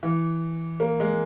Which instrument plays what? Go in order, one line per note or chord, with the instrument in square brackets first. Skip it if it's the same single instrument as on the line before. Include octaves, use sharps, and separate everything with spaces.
[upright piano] E3
A#3
G#3